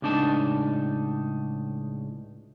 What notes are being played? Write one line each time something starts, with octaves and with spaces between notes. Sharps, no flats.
C#2 A2 D4 D#4 A5